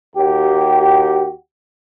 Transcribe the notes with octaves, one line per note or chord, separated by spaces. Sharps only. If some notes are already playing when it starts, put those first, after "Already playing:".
D#2 F#4 G4